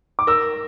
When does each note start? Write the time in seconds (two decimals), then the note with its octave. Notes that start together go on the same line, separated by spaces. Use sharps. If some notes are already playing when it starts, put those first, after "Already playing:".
0.19 D6
0.27 A#4 E6